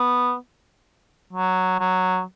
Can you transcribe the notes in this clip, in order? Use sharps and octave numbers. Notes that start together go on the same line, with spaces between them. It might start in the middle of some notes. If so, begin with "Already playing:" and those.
Already playing: B3
F#3
F#3